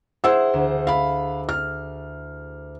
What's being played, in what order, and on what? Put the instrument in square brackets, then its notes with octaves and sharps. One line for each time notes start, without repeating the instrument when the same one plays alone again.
[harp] E4 G#4 [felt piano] C5 F#5 E6
[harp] D2
[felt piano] F5 B5
F6